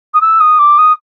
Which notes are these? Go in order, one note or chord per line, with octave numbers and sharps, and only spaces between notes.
D#6
E6
D#6
D6
D#6